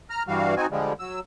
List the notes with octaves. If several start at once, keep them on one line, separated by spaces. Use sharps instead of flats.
A#5 F6
G2 E3 G3 F#4 F5
C4 D#4 F#4 G#5
D3 F3 G3 G#3
F#3 E6